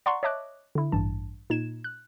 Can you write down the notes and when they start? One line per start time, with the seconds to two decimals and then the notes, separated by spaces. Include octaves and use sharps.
0.06 D5 F#5 A#5 C6 C#6
0.23 C#5 D#5 E5 A5 D6 F#6
0.75 D3 E4
0.92 A1 G2 A5
1.50 A#2 D#4 G#6 E7
1.84 F#6